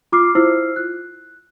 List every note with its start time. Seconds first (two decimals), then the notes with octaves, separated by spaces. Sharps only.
0.12 F4 D6 F6 C7
0.35 E4 F4 C5 E6 F6 C7
0.76 F#6